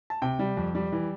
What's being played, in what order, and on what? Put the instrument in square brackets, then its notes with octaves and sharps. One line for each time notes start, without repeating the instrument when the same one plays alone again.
[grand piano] A5
C3 G5
G3
F2
G3
E3